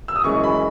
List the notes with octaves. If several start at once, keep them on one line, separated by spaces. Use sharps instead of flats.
E6
D#6
F#2 E3 G#3 C#6
B5